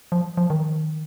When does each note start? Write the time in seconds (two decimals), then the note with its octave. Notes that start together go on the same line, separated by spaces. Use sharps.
0.12 F3
0.37 F3
0.50 D#3